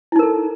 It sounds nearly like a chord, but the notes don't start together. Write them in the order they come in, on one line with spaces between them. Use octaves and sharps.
E4 D#4 A#4 A4